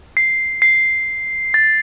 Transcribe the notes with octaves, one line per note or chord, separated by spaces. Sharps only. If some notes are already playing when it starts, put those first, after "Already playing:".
C7
C7
A6